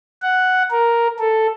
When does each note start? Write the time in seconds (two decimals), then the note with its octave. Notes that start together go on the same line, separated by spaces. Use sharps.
0.22 F#5
0.71 A#4
1.19 A4